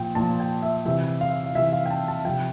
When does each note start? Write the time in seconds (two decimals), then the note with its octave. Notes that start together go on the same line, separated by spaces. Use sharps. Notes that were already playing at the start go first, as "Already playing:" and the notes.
Already playing: A#2 F3 G5
0.15 A#2 F3 A5
0.40 G5
0.62 E5
0.85 C3 E3 E5
1.21 F5
1.46 F5
1.55 C3 E3 E5
1.73 F5
1.86 G5
1.90 A5
2.08 A5
2.25 C3 F3 G5